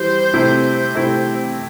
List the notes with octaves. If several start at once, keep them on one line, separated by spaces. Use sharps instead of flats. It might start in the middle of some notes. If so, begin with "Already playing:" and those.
Already playing: E3 G3 E4 G4 C5
C3 A3 C4 E4 G4
C3 A3 C4 E4 G4